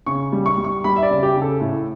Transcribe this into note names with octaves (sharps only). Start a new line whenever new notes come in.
C#3 C#6
G3
C#6
G3
C#6
G3 B5
E5
D5
C#3
G4
C#3
A4
A2